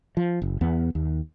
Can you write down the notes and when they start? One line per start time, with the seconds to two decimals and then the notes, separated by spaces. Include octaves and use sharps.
0.17 F3
0.42 F#1
0.61 E2 B3
0.95 D#2